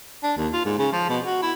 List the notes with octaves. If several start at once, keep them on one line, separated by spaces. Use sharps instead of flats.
D4
D#2
F4
G#2
C#3
F3
B2
F#4
E4